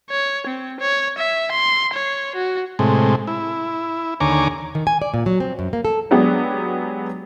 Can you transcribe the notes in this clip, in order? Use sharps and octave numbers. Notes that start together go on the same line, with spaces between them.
C#5
C4
C#5
E5
C6
C#5
F#4
A2 C3 G#3
E4
D#2 D3 C#5 G#5 A#5 D6
D#3
G#5
D5
A#2
F#3
C4
F#2
A#3
A4
F#3 G#3 B3 D4 G4 G#4